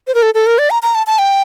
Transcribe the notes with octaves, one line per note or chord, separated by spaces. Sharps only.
C5
A#4
A4
A4
A#4
D5
A#5
A#5
A5
A5
G5